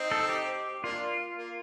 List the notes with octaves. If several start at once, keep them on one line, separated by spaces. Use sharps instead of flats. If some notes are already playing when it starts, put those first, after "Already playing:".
Already playing: C4 D#4
A4
G4
A#3 D4 F4
A#3